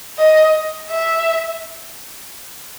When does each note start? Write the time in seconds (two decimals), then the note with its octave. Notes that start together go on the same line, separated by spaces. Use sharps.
0.18 D#5
0.90 E5